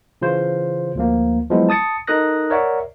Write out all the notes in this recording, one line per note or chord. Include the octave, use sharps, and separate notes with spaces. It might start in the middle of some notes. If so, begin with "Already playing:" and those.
C#3 E3 F4 C5
D2 F3 A#3
F3 F#3 G#3 B3 E4
A5 D#6 A6 C#7
D#4 A4 A#4 D#6 F#6 A#6
A#4 C#5 D5 E5 F#5